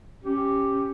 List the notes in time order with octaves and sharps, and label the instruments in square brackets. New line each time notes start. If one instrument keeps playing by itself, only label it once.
[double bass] C#4 [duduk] G4